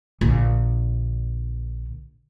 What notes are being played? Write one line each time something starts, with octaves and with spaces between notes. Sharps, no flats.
A#1 D3